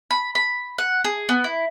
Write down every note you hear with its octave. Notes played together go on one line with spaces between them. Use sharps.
B5
B5
F#5
G#4
B3
E4